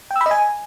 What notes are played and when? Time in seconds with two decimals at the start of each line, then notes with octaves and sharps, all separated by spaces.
0.11 G5
0.16 E6
0.21 B5
0.26 D#5
0.31 G#5